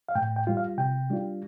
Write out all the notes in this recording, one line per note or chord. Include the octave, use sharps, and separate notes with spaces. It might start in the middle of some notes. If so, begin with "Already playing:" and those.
F5
A2 G5
G5
G3 F4
F5
C3 G5
G3 D4 F4